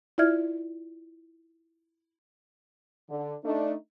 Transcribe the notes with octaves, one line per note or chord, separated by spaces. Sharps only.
E4 F4 D5 E5 F6 G#6
D3
A3 D4 D#4